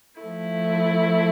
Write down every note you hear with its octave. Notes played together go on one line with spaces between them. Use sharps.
F3 A3 E4